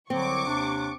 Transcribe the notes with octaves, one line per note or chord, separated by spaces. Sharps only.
C2 D3 F#3 C4 C#6 D6
D#2 C3 D4